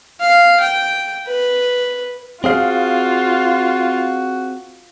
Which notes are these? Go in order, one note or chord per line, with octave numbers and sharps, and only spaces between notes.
F5
G5
B4
C4 F4 F#4 G#4 F5